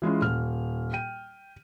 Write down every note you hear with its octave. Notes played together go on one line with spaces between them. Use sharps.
E3 G#3 C#4 F4
D#1 F6
G5 D#7